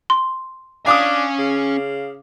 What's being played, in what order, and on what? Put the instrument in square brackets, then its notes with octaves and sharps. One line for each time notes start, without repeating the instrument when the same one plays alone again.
[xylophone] C6
[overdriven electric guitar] C#4 G#5 [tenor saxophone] D4 [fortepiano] F5 D6 D#6
[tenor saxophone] C#3